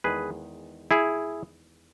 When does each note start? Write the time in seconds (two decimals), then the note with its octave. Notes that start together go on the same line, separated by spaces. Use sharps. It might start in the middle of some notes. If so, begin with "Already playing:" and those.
0.04 E2 D#3 G#3 G#4 B4
0.91 E4 G#4